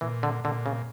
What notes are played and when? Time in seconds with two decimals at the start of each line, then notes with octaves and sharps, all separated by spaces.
0.01 A#2 E3
0.23 D3
0.44 A#2 D3
0.66 C#3